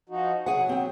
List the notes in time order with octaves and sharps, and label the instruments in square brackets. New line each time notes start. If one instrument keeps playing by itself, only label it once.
[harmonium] F3 D#4 F#4
[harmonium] F#3 [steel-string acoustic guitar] G#4 F#5
[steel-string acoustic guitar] C4 G5